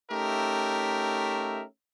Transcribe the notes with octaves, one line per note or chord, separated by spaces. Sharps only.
A3 C#4 D#4 G4 A#4 E5